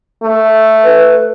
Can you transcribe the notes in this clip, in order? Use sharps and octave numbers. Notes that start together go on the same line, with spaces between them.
A3
B4